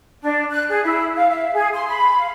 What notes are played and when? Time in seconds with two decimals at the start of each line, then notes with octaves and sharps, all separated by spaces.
0.22 D4
0.50 F#6
0.69 G#4
0.83 E4
1.16 F5
1.30 E5
1.54 G#4
1.73 C6
1.87 B5
2.19 F5